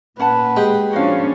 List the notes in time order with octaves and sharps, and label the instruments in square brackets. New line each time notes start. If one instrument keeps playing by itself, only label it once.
[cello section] A#2 [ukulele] C#4 F#5 A5 [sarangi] B4
[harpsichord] G#3 [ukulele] G4
[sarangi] F3 [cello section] C#4 D4 C#5 [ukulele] F#4 F5